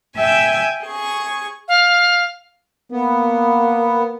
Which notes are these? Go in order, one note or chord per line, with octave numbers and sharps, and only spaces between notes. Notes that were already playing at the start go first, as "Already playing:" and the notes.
E5 G5 G#5 E6
G#4 C#6
F5
A#3 B3